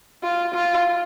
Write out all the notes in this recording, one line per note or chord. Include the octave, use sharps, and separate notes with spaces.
F4
F4